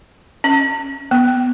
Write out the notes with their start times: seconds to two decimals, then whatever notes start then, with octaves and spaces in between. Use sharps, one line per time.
0.44 C#4
1.11 B3